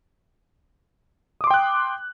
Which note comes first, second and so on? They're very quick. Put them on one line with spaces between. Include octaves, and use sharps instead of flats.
D#6 D6 C6 G5 F#6